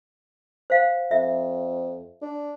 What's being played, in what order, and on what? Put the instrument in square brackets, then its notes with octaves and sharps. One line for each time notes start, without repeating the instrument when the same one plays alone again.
[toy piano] C5 F5 F#5
[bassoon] F2 [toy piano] E5
[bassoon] D4